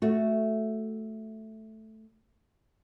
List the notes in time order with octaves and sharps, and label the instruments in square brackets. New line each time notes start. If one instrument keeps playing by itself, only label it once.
[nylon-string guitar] A3 F#4